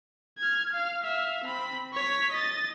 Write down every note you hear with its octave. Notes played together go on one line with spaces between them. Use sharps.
F6 G#6
F5
E5 F5
C4 B5
C#5 B6
D#5 A6